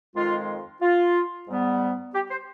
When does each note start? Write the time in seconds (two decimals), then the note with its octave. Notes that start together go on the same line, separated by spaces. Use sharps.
0.15 F2 D#3 G#3 F4
0.82 F4
1.48 G#2 G3 B3
2.15 G4
2.31 C5